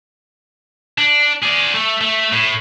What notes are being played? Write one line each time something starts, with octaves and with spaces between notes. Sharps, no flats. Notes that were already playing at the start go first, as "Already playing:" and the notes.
D4
G#4 D5
A3
A3
A2